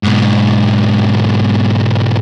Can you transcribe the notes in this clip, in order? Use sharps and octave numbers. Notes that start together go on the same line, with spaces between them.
G#2 B2